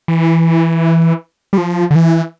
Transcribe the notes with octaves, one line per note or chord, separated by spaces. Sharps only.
E3
G3
F3
D3
E3